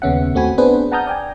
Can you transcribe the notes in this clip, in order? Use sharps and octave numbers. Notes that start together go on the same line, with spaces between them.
D#2 C#3 B3 C#4 E5 F#5
D#2 A3 C4 F#4 G#5 B5
B3 C4 D4 G#4 B4 C5
F#5 A5 A#5 D#6 F6 G6
D5 G5 G#5